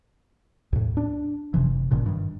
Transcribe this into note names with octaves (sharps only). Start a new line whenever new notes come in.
D#2 A2
D4
F#1 C3 E3
G1 G2 A#2 C#3
G2 D#3